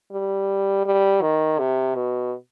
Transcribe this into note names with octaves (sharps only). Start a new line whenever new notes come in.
G3
G3
D#3
C3
B2